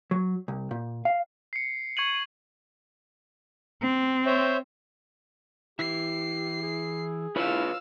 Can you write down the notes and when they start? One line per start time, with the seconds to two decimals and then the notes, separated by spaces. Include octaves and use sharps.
0.11 F#3
0.48 C2
0.71 A#2
1.05 F5
1.53 C7 C#7
1.97 C#6 G#6 C#7 D#7 F#7
3.82 C4
4.26 C5 C#5 E5
5.79 E3 E4 G4 C7
6.62 G#4
7.36 E4 F4 B4 C#5 F5 E6